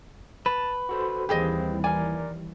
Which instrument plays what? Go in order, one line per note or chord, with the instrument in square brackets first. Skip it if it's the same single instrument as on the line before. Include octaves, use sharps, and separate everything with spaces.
[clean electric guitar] B4 [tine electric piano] A5
[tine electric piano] F#4 A4 C5
[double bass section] D#2 E3 G3 [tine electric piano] A#3 C4 [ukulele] G4 G#4 D#5
[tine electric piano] A#4 D5 [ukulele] G#5